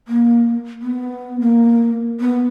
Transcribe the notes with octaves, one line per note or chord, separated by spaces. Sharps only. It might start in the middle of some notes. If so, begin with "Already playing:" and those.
A#3
B3
A#3
B3